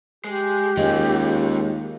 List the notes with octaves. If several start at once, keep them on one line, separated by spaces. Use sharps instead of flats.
G#3 G4
D#2 G#3 C#4 F4